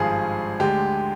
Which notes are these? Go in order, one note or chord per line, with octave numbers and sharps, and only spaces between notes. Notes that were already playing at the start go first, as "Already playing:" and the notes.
Already playing: G#1 G2 F3 G#3 G#4
D2 D3 G#3 G4